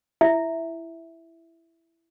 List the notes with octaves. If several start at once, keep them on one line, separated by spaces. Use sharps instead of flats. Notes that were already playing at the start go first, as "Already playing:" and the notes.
E4 E5